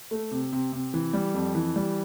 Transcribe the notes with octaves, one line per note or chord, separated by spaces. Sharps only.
A3
C3
C3
C3
E3
G3
F2
E3
G3